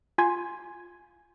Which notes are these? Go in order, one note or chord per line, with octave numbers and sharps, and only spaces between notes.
F4 G#5 C6 G#6